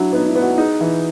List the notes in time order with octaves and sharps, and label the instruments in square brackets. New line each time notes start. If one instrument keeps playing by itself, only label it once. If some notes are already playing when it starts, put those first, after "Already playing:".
Already playing: [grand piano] F#3 E4 [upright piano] D4
[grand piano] B3 [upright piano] D#4
[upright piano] E4
[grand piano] B3
[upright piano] F#4
[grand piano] D#4 [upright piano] G#4
[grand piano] E3